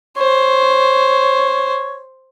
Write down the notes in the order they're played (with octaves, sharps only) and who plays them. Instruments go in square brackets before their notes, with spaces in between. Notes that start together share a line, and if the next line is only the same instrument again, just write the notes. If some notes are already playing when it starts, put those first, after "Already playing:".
[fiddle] C5 [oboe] C#5